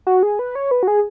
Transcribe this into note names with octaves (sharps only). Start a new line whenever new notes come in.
F#4
G#4
B4
C#5
B4
F#4
G#4